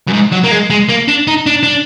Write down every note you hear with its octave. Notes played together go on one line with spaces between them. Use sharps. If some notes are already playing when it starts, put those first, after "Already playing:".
F#2
G#2
F#3
A#3
G#3
G#3
A#3
D4
D#4
D4
D4